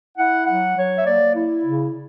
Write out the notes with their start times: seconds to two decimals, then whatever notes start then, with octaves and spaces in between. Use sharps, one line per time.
0.18 E4 F#5
0.47 F#3 F#5
0.77 F#3 C#5
0.98 E5
1.06 A#3 D5
1.36 E4
1.65 C#3